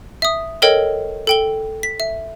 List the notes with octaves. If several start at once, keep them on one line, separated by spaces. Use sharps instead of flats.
E5 D#6
A4 A#4 C#5 D#5 G5
A4 G5 G7
B6
E5